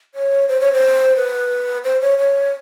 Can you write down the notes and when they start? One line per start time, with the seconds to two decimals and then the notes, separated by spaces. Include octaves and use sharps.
0.14 C#5
0.48 C5
0.60 C#5
0.73 C5
1.16 B4
1.84 C5
2.01 C#5
2.19 C#5